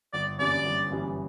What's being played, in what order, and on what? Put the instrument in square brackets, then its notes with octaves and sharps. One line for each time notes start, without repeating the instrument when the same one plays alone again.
[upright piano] G1 [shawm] D5
[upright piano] F#2 E3 G3 D4 [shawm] D5
[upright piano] G1
F#2 E3 G3 D4